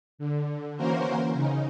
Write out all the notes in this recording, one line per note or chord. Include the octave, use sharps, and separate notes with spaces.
D3
E3 A#3 C#4 F#4 A#4 C5
C#3 D#4